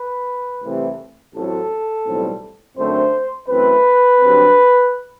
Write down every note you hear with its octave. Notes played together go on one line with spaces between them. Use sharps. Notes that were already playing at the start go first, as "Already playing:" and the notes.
Already playing: B4
C2 C3 E3 A3 C4
A1 A2 F#3 C4 A4
B1 A2 E3 G3 C4
F#2 D3 A3 C4 C5
F#2 E3 A3 C4 B4
G2 D3 F#3 C4